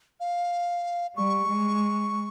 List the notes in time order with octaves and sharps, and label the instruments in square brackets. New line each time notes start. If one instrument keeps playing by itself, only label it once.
[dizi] F5
[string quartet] G3 [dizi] C#6
[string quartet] G#3